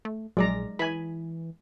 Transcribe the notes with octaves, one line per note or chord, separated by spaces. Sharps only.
A3
A#1 F#3 G#3 D5 A#5
E3 G#5 B5